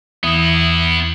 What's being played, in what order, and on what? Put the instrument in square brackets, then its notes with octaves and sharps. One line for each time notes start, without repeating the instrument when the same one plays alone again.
[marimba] E2 E3 D#6 [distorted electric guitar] B3 E4